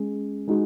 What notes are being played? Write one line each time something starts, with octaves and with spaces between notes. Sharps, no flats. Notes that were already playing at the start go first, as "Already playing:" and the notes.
Already playing: G#3 C#4 G#4
G#3 D#4 F#4